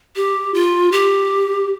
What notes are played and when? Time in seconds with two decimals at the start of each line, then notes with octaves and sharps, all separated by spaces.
0.16 G4
0.54 F4
0.92 G4